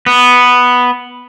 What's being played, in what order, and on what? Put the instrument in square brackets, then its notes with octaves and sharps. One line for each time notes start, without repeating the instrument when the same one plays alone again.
[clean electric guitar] B3